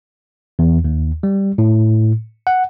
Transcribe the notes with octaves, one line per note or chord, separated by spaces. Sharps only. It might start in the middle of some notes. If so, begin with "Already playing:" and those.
E2
D#2
G3
A2
F#5